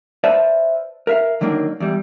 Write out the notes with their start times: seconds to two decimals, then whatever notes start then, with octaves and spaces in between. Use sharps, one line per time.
0.24 B4 C5 D5 E5 F5 A5
1.07 A#4 E5 F5
1.41 D3 D#3 F#3 A#3 D4 D#4
1.80 E2 G3